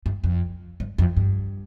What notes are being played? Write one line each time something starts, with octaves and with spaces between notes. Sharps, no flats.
G2
F2
G2
F2
G2